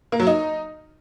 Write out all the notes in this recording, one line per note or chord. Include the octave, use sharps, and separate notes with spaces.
A#3
F#3
D#4